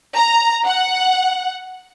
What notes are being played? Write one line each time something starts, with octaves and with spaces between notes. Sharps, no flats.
A#5
F#5